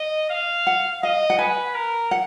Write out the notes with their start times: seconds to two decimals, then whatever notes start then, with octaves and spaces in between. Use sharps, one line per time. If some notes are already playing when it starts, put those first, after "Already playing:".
Already playing: D#5
0.30 F5
0.67 F#5
1.03 D#5 F5
1.30 F#5
1.39 B4 G#5
1.75 A#4
2.11 F#5